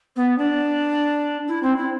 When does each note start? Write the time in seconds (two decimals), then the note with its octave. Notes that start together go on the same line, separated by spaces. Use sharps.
0.16 B3
0.38 D4
1.48 E4
1.62 C4
1.76 E4